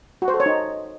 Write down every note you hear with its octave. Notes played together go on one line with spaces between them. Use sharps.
F#4
C5
A4
C#5
D#4